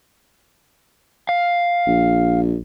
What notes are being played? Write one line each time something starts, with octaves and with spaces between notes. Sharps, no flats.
F5
A#1